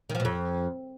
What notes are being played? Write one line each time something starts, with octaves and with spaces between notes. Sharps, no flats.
D#3
F3
B2
F2